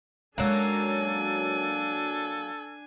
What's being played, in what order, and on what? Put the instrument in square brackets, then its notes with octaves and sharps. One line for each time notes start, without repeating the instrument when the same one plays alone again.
[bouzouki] F#3 A#3 [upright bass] G#3 C#4 [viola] D4 G#5 [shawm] A4